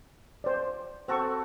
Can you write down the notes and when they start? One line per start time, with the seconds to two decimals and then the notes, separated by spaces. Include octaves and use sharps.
0.44 C5 D5
1.08 C4 F#4 A4 C5 C#6